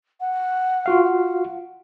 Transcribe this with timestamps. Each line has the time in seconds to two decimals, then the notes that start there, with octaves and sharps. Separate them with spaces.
0.21 F#5
0.86 F4 F#4 F5
1.04 F#5